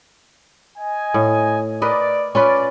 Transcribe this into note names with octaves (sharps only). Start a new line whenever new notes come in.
D#5 G#5
A2
A#4 B4 D5 D#5
C#4 F4 B4 D5